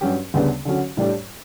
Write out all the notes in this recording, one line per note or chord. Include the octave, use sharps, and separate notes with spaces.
G2 F#3 C#4 G4
D2 C#3 G3 B3 D4
D3 F#3 C#4 F#4
A2 G3 D4 G4